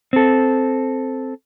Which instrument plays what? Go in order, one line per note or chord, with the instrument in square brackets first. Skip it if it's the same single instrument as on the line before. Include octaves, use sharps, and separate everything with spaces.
[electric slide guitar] C4 A4